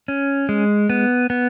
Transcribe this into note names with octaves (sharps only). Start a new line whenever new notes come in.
C#4
G#3
B3
B3